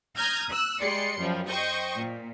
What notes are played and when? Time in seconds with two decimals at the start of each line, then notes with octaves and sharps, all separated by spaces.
0.15 A#5 D#6 F6 G6 G#6 A#6
0.51 E6 F#6
0.81 G3 G#3 D5 C6 C#7
1.19 F#2 F3 G3
1.48 C5 D#5 G5 C#6
1.97 A#2